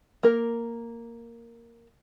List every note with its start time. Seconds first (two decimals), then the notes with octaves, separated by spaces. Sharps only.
0.23 A#3 A#4